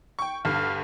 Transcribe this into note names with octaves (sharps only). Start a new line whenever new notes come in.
G5 C#6
D2 G2 F5